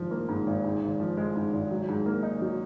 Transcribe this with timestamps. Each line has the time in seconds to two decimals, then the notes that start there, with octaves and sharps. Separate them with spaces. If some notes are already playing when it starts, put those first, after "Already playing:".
Already playing: G#1 G#2 F3
0.11 A#3
0.29 G#2
0.46 G#1
0.64 G#2
0.82 G#1
1.00 F3
1.17 G#3
1.36 G#2
1.53 G#1
1.71 F#3
1.89 G#2
2.06 A#3
2.23 D#4
2.41 F#3